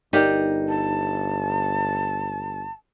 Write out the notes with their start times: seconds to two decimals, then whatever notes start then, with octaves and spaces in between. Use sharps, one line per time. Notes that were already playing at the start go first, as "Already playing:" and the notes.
0.13 G1 D#4 G4 A#4 D5
0.68 A5